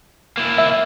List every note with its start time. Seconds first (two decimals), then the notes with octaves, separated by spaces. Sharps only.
0.37 A#3 E4
0.58 E5